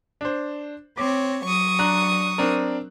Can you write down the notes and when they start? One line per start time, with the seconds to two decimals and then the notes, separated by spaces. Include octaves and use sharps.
0.21 D4 C5
0.97 C4 C#5 D6
1.45 F#3 C#6 D#6
1.79 D4 A#5 F#6
2.38 C4 D4 A#4